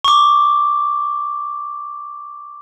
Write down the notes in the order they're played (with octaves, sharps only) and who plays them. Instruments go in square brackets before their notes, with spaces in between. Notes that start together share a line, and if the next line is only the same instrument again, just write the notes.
[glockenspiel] C#6 D6